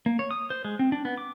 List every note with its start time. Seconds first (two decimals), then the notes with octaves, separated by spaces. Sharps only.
0.06 A#3
0.19 C#5
0.31 D#6
0.50 C5
0.65 G#3
0.79 C4
0.92 D4
1.05 B3
1.18 D6